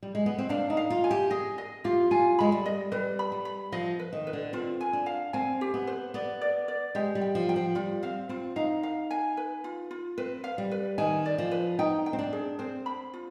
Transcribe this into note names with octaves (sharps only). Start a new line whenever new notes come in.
G3
G#3
B3
C4
D4 F5
D#4
F5
F4
G#5
G4
G#4 D#5
D#5
F4 G4
F4 G#5
G#3 B5
G3
D#5
G3 B4
B5
G3
B5
F3 D#5
B4
D#3
B4
D3
C4 F4
G#5
D4
F5
C4 G#5
G4
B3
C5
B3 D5
D5
D5
G#3 G4
G3
G5
F3
G5
F3
G3 F4
C4 F5
C4 F4
D#4 F5
F5
G#5
B4
F4
F4
C4 B4
F5
G3
B4
D#3 G#5
D5
F3
B4
D#4 G5
G5
C4
D4
G#4
C4 C5
B5
F4